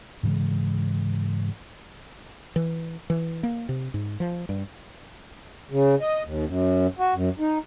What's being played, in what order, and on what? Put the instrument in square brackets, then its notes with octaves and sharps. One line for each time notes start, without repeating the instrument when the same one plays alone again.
[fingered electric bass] G#2 C#3 E3 G#3
[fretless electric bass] E3
E3
A#3
C3
G#2
F3
G2
[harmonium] C#3
D#5
D#2
F#2
F#4
F#2
D#4